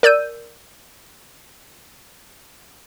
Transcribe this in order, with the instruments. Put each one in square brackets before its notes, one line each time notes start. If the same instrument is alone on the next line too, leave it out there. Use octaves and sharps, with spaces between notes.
[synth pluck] A#4 D5 E6 G6 D#7